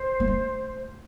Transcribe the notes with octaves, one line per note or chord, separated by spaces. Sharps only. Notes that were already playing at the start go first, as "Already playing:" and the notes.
Already playing: C5
A#3
A3